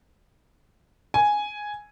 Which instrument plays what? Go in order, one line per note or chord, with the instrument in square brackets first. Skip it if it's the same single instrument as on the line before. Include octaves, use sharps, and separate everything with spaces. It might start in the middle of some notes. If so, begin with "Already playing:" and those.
[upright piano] G#5